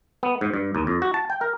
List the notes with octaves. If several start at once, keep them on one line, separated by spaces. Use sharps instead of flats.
B3
G#2
G2
D#2
F2
F#4
A5
G5
A#4